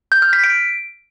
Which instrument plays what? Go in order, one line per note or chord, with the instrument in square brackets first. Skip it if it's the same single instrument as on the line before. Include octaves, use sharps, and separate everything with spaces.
[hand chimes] G6
F6
B6
D7